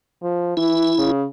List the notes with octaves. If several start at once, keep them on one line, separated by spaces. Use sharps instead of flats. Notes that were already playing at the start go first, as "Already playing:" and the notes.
F3
E3 E4
C#3